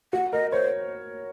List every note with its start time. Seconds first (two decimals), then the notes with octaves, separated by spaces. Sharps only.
0.13 F#4 F#5
0.33 A#4 D#5
0.52 C5 C#5